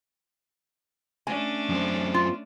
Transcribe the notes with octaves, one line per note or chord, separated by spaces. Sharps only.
A3 C#4 D4 G#5
F#2 C4
F4